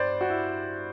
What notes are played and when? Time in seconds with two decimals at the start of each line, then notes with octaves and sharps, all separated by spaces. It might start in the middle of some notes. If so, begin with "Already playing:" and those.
Already playing: G2 G3 C5 D5
0.21 F#4
0.30 E4